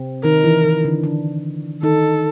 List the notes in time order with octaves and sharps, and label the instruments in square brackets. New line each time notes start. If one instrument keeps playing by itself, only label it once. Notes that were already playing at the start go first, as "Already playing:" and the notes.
Already playing: [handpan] C3 C4
[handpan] D#3 D#4 [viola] A#4
[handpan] E3 E4
D#3 D#4
D3 D4
D3 D4
[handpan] D#3 D#4 [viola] A4